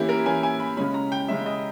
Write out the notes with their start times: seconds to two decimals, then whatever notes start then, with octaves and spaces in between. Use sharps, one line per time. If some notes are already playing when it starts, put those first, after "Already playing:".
Already playing: E3 A#3 C#4 E4 G4
0.09 A#4
0.26 E3 A#3 C#4 G#5
0.43 G#5
0.60 B5
0.77 C#3 G#3 C#4 B5
0.94 A#5
1.12 G5
1.28 C#3 G#3 C#4 E5
1.46 D#5